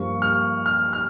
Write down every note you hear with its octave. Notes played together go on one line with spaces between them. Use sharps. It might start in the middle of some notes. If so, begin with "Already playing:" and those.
Already playing: G2 F3 A#3 F4 C#6
F6
F6
F6